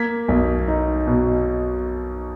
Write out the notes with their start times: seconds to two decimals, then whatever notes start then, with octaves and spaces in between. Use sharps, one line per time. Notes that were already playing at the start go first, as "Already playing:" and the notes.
Already playing: A#3 G#6 B6
0.28 B1
0.68 D#4
1.07 B2